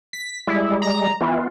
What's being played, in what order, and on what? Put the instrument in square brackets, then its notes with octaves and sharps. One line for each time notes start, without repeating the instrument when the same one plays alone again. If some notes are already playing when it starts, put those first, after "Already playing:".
[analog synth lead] B6
[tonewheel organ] G3 G#3 [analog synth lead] E4
[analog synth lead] A#5
[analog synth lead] E3 [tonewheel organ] B3 F4